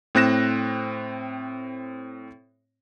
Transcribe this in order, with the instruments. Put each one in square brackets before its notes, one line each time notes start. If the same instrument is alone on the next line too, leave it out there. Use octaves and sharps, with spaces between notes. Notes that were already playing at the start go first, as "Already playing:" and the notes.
[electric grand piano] A2 C4 F#6 A#6 E7